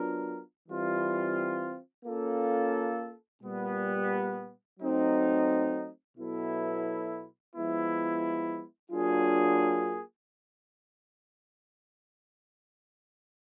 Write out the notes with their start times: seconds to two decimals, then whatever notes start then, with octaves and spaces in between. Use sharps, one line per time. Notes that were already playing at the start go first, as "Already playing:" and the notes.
Already playing: F#3 B3 D4 F4 A#4
0.68 E3 G3 C4 F4
2.05 A#3 C#4 F4 A4
3.41 A#2 G3 B3
4.79 F#3 A3 C4 D#4
6.16 B2 F#3 B3 E4 A4
7.54 F3 G#3 B3 E4
8.90 F#3 A#3 D4 F4 G#4